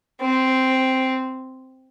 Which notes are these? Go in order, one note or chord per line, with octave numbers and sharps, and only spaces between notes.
C4